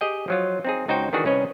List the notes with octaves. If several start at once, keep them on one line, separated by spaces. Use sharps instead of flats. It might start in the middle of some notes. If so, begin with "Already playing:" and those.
G4 G#4 D#5 G5
F3 F#3 F4
C4 D#4 G#4
C#2 D#4 F#4 C5 G5
D#3 E3 D4 F#4 G#4 F#5
C2 C#4 B4 C#5 D#5